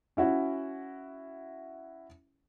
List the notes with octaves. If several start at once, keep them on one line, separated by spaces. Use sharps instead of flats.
C#4 E4 F#4